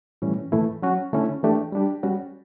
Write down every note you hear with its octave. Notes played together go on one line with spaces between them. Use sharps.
A2 E3 G3 C#4
A2 E3 A3 E4
F#3 C#4 F#4
D3 A3 C#4 E4
E3 A3 D4 G4
G3 D4 G4
G3 C#4 F#4